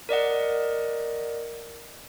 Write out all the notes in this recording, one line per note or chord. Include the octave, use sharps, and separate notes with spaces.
A#4 D5 D#5 F#5